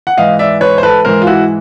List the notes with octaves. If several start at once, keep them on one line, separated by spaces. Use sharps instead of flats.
F#5
G#2 E3 D#5 F5
D5 E5
B4 C#5
C5
A4 B4
G#2 E3 A#4 C5
F4
E4 F#4